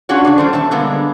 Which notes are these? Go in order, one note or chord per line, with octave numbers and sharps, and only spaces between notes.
C#4 D4 F4 F#4 G#4 C#5
C#3 D5
E2 G3 C#4 A4 C5
B2 E5 A5
D3 G3 G#3 A#3 B3